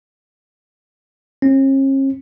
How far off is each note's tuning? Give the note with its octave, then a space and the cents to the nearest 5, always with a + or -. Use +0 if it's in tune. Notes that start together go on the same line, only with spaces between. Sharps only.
C#4 -45